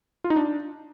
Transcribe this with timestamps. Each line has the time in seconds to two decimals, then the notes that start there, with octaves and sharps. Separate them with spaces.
0.24 F4
0.30 D#4
0.36 D4